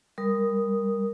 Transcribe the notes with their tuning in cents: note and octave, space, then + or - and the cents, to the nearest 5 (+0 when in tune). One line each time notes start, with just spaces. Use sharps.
G3 +20 A#4 +0 D#6 +0